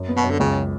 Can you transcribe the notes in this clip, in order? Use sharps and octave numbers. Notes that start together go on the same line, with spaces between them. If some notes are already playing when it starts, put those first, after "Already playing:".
Already playing: F#2
B3
B2
F#2
D3
C#2 C#3